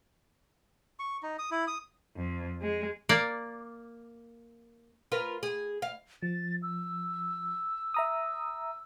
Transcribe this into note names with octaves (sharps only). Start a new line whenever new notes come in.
C#6
D#4
D#6
E4
D#6
F2
G#3
A#3 D5
F4 A#4 B4
G#4
F5
F3 A6
E6
E5 A#5 D#6